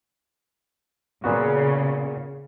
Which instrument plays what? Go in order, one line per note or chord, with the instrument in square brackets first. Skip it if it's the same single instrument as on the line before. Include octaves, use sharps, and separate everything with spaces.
[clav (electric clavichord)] A#2 B3 F#4 [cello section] C#3